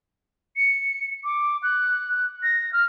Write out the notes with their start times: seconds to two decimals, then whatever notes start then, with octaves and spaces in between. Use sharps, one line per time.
0.57 C#7
1.24 D6
1.63 F#6
2.43 A#6
2.73 F6